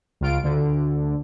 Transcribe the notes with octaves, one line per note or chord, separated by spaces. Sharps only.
C#2 F4 D7
D2 D3